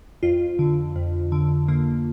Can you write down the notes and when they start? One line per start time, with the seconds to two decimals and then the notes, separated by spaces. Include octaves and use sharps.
0.23 F2 F4
0.59 D3
0.96 F2
1.32 D3
1.68 D3 A#3